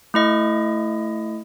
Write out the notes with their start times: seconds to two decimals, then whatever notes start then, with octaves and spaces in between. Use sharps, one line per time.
0.14 A3 E4 D#5